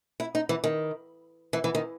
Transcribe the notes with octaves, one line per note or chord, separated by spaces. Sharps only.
E4
D#4
E3
D#3
E3
E3
D#3